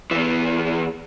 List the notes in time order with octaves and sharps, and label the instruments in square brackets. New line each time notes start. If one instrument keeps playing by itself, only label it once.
[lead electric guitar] E2 E3